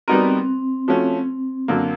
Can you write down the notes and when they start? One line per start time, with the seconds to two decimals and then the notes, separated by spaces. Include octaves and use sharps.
0.08 G3 B3 C4 D#4 F#4 A#4
0.88 F3 A3 C#4 F#4
1.68 F#2 D3 F#3 A#3